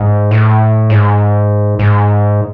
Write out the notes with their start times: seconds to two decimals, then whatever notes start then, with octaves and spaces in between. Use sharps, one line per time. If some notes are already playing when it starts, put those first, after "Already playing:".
Already playing: G#2
0.31 A2
0.90 G#2
1.79 G#2